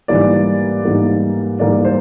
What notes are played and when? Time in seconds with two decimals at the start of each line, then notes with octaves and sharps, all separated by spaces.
0.08 G#2 E3 G3 A#3 D5
0.84 G#2 E3 G3 A#3
1.59 G#2 E3 G3 A#3 D5
1.85 C5